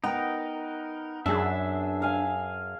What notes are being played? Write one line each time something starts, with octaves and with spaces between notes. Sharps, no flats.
B3 D#4 A#4 G5
F#2 D4 G#4 E5 E6
A#4 F5 G#5